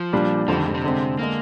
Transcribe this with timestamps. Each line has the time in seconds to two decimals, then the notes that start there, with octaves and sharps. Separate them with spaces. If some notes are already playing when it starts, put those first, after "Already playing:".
Already playing: F3
0.13 A#2 G3 D4
0.48 F2 D3 F3 G3 C4
0.57 D#3
0.66 G#2
0.74 C3
0.84 D3 G#3 C4
1.19 D3 G#3 A#3